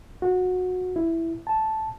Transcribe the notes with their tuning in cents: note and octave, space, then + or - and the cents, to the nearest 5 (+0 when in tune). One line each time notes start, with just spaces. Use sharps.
F#4 -20
E4 +5
A5 -5